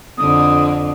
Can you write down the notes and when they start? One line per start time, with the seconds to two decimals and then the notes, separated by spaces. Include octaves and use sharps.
0.18 F2 D3 D#6